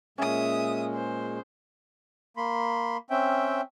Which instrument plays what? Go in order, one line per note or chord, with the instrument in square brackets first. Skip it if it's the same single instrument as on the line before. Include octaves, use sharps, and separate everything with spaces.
[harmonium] A#2 G#3 [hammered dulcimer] C#4 G#4 [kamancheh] E5 D#6
[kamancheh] C5
[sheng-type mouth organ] A#3 B5 C6
C4 C#4 E5 G5